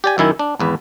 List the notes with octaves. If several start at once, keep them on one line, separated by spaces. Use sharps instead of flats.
G4 D5 G#5
F#2 D#3 E4 G#5
D4
G#1 E2 B4